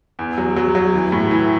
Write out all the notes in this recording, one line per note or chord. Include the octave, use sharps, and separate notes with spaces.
E2
F#3
F#3
F#3
E3
A2
E3